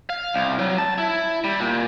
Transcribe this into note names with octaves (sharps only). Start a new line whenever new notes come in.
F5
C2
F#3
A5
E4
G3
A#2